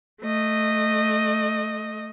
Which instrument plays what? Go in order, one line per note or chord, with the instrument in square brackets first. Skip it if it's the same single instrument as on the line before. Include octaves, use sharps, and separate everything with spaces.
[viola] A3 D#5